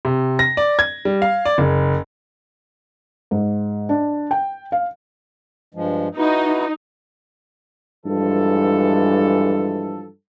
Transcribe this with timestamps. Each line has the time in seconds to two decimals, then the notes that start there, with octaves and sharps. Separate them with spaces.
0.05 C3
0.39 A#6
0.57 D5
0.79 G#6
1.05 G3
1.22 F5
1.46 D5
1.58 F#1
3.31 G#2
3.89 D4
4.31 G5
4.72 F5
5.75 G2 F3 G#3
6.17 D#4 E4 F#4 B4
8.06 G2 E3 F3 G#3 A4